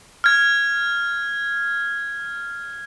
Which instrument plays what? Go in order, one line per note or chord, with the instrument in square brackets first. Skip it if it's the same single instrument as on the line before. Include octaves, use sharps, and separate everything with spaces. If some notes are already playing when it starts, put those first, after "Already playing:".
[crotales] F6 G#6